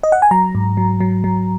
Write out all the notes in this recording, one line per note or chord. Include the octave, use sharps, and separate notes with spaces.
D#5
F#5
G#5
F#3 A#5
G#2
F#3
F#3
F#3